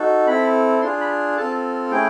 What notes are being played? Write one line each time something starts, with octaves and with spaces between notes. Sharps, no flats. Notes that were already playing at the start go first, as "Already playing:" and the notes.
Already playing: D#4 F#4 A4
C4 E4 A4 B5
D4 F4 G#4 C6
B5
C4 F4 A4 A5
A3 C#4 E4 G#4 G5